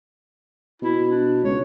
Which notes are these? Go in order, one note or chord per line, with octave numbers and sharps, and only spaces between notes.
B2 E4
D4
C#2 C#5